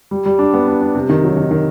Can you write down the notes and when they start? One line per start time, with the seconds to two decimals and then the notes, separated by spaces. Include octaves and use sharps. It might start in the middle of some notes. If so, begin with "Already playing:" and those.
0.11 G3
0.25 G3
0.39 D4
0.54 B3
0.68 D4
0.81 D4
0.95 C3
1.09 D#3
1.24 F#3
1.37 D#3
1.51 D#3